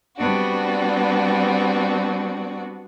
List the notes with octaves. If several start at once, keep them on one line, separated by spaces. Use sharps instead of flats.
G3 B3 C4 D4 F#4